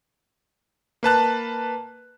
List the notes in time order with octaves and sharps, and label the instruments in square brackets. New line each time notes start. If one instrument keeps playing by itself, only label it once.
[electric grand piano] A#3 B4 A5 F#6